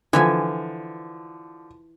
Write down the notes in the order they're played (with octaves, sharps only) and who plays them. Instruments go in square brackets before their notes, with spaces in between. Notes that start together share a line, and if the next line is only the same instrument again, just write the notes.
[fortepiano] D3 F3 [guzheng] E3 E5 G#5